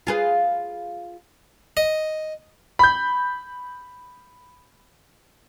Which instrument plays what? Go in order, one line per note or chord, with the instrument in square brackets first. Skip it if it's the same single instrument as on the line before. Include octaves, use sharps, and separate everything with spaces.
[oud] F4 G#4 B4
[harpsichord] D#5
[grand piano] B5 G6